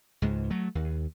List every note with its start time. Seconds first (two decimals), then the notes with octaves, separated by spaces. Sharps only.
0.22 C#2 G#2
0.50 F#3 A3
0.75 D#2